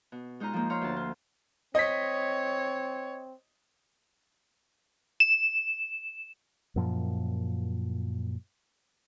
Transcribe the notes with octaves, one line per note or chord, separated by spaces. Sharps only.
B2
G#3 D#4 F4 D#5 A#5
F3 A#3
C#5 F5 A#5 C6
D2 A5
F4
C4 C#5 D#5 B6
E7
F#2 A#2 F3